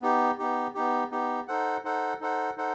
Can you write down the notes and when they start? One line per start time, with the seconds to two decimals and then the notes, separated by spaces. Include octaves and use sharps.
0.02 B3 D#4 G4
0.39 B3 D#4 G4
0.74 B3 D#4 G4
1.11 B3 D#4 G4
1.48 D#4 A4 C5 F#5
1.84 D#4 A4 C5 F#5
2.20 D#4 A4 C5 F#5
2.57 D#4 A4 C5 F#5